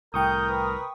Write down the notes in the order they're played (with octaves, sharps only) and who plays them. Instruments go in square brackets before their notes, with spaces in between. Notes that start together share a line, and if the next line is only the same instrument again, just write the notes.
[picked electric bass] C2 A2 [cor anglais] A#4 [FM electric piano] G5 C#6 D#6 [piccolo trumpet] G6
[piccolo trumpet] B4